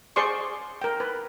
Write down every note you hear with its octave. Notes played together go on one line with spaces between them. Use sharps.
G#4 C5 D5 C6 C#6
A#4 G5
B4